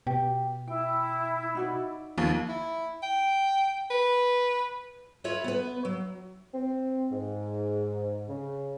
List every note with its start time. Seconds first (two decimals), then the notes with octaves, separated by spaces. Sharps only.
0.07 B2 G4
0.68 E4 G5
1.55 D#4 F#4 D5
2.18 D#2 F3
2.49 E4
3.03 G5
3.90 B4
5.24 E4 F4 B4 C#5 E5
5.44 B3 B4
5.85 F#3
6.54 C4
7.12 G#2
8.29 C#3